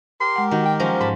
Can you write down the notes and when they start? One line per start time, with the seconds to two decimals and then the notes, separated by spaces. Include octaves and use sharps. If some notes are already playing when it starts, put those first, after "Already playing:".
0.21 G4 A#4 C6
0.36 G#3 F#5
0.51 D#3 F#4
0.65 G5
0.80 F3 F#3 C#4 C5 A#6
1.00 G#2 A5 B5